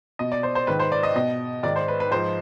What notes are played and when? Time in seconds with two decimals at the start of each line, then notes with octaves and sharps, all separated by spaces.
0.19 B2 D#5
0.32 D5
0.43 C5
0.55 C5
0.67 G#2 D#3 B4
0.79 C5
0.92 D5
1.03 D#5
1.16 B2 D#5
1.63 G#2 D#3 D5
1.76 C5
1.88 B4
2.00 B4
2.11 G#2 F3 C5